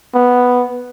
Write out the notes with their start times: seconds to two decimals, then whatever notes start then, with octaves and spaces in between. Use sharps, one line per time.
0.15 B3